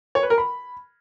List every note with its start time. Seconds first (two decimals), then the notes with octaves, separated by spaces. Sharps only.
0.15 C#5
0.23 B4
0.30 A#4
0.38 B5